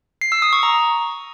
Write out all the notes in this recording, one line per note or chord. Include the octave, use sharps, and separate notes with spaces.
C7
E6
D#6
C#6
A#5